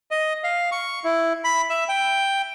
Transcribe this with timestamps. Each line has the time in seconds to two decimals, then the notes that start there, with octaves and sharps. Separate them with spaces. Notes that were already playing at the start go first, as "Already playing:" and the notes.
0.11 D#5
0.44 F5
0.72 C#6
1.04 E4
1.44 B5
1.70 E5
1.89 G5